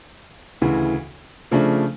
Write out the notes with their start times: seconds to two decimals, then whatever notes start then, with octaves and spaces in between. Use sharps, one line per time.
0.62 D2 C#3 E3
1.51 C#3 F3 A3 D4